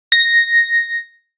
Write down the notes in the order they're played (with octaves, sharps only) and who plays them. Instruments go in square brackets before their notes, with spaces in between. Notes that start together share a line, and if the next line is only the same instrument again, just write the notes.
[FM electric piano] A#6